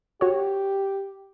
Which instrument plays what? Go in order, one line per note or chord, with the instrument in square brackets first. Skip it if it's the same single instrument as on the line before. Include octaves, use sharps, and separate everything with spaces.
[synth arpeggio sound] F#4 C#5 [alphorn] G4